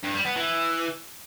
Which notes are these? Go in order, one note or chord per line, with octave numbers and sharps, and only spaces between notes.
G2
G3
B3
E3